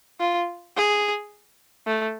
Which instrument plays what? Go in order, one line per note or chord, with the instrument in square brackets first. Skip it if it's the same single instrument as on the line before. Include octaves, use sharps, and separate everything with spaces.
[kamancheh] F4
G#4
A3